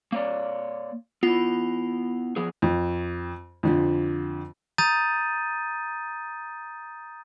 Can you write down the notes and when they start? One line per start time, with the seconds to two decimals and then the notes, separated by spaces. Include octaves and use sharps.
0.12 A#3 C#5 D5
1.23 B3 E4 F4
2.36 F3 B3 G#4
2.62 F2
3.63 F2 D3 F3
4.78 A#5 D#6 G6 A6 D#7